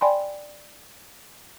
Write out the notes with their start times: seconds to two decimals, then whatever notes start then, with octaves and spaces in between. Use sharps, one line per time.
0.01 D5 G5 G#5 B5 C6